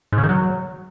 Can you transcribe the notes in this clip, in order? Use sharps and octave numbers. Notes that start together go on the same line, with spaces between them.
G#2
C#3
D#3
F#3